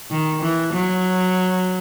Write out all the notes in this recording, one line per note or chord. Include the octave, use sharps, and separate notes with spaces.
D#3
E3
F#3